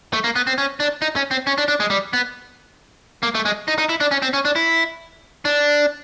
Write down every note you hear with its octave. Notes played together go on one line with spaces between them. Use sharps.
A3
A#3
B3
C4
C#4
D4
D#4
C#4
C4
C#4
D4
D4
G#3
G3
B3
A#3
A3
G#3
D#4
D#4
E4
D4
C#4
C4
C#4
D4
E4
D4